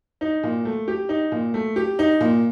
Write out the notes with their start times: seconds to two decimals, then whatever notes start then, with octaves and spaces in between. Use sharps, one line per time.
0.21 D#4
0.43 A#2
0.65 A3
0.88 G4
1.09 D#4
1.32 A#2
1.54 A3
1.76 G4
1.99 D#4
2.21 A#2